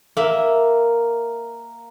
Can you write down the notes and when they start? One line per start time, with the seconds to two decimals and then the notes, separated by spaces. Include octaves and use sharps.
0.17 A#3 E5